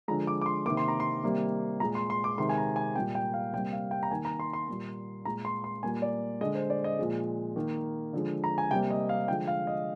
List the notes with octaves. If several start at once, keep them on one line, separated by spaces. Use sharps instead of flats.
D3 F3 G#3 A#5
D6
D6
C6
C3 D#3 A#3 D6
C6
A#5
C6
C3 D#3 G3 A#3
A#2 G#3 A#5
C6
C6
D6
C3 D#3 G#3 C6
G#5
A#5
G#5
A#2 G3 A#3 G5
G5
F5
C3 G3 A#3 G5
F5
G5
A#5
D#3 A#3 G#5
A#5
C6
C6
A#2 G3 A#3
A#2 G#3 A#5
C6
C6
A#2 G3 A#3 G#5
D5
D3 G#3 D#5
C5
D5
D#5
A#2 F3 G#3
D#3 A#3
D3 F3 G#3
A#5
G#5
C3 G3 A#3 G5
D#5
F5
D3 F3 G#3 G5
F5
D#5